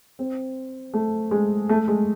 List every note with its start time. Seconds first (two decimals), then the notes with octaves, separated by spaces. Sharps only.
0.19 C4
0.94 A3
1.31 G#3
1.69 A3
1.88 G#3